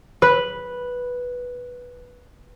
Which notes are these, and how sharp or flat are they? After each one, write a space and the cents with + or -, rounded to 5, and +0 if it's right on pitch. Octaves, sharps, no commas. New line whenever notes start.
B4 -5